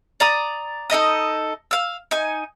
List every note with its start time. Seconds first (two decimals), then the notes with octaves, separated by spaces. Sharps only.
0.20 D5 A#5 D#6
0.90 D#4 A4 D#5 D#6
1.71 F5 E6
2.11 D#4 G#5